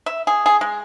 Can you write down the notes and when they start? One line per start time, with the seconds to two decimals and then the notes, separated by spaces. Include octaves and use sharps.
0.06 E5
0.27 G#4
0.46 G#4
0.61 G#3